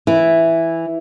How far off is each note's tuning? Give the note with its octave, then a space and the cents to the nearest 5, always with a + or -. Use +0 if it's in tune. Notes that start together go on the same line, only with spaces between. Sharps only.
E3 +0 E4 +0